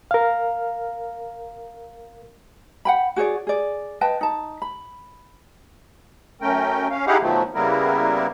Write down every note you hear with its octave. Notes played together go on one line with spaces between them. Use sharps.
A#4 F5
F#5 G5 B5
F#4 G#4 C#5 D5
G#4 D5
B4 D#5 G5 A5
D#4 A5
B5
F#2 A3 C#4 A#4 G5
C#4 F5
D#4 E4 G4 G#4 F5 F#5
B2 D#3 F3 F#3 A3
C#3 G3 A#3 B3 E4 A#4